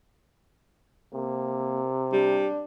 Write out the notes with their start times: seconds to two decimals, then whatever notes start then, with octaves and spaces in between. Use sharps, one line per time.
1.13 C3 A#3
2.13 G3 D4